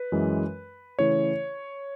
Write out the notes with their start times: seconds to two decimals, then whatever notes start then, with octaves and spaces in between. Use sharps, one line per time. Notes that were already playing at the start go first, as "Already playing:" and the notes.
Already playing: B4
0.12 F#2 E3 G#3
0.99 C#3 E3 A3 E4 C#5